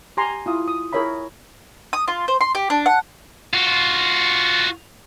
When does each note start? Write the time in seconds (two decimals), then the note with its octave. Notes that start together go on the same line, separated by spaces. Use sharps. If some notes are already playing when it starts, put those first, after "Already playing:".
0.17 G4 G#5 A#5 C6
0.46 E4 F4 D#6
0.68 D#6
0.93 E4 G#4 A#4 C#5 E5 B5
1.93 D#6
2.08 F4
2.28 C5
2.41 C6
2.55 G4
2.70 D4
2.86 F#5
3.53 F4 F#4